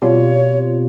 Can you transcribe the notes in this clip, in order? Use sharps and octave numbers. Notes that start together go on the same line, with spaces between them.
B2 G3 C4 F4 C#5